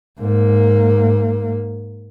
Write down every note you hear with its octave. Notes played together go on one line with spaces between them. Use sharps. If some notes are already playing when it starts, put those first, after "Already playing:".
G#2 A#3